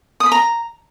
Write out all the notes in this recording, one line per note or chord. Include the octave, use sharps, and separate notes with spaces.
D#6
B5
A#5